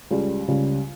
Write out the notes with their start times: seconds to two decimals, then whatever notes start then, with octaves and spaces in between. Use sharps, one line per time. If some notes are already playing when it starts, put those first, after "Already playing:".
0.11 C#2 C#3 G3
0.48 C#2 C#3 G3